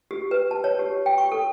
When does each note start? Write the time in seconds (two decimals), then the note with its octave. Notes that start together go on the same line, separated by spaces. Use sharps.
0.11 G4
0.31 B4
0.51 A5
0.64 C#5
0.79 G4
1.06 G5
1.18 C#6
1.32 A4